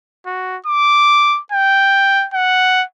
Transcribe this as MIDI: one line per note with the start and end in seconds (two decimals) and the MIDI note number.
0.26 0.57 66
0.66 1.40 86
1.52 2.27 79
2.34 2.84 78